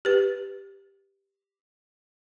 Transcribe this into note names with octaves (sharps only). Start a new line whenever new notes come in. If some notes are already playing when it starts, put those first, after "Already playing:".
G4 B4